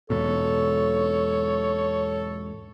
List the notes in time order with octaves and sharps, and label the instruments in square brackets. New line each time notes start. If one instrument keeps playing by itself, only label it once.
[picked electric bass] E2 G#2 B2 [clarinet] A4 [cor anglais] C#5